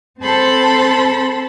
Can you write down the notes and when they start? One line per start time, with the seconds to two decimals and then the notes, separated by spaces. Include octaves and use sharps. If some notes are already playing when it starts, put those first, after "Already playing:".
0.20 C4 A4 C5 A5 B5 C6